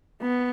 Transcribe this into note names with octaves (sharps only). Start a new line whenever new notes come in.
B3